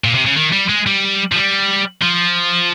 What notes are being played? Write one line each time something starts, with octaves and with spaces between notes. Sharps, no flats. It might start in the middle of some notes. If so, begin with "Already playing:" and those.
A#2
C3
C#3
D#3
G3
G#3
G3
F3
G3
F3